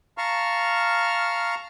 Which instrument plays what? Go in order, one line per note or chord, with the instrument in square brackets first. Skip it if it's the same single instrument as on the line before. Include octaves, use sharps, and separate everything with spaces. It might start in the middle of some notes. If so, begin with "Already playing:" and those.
[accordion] F5 A5 A#5 C#6 F6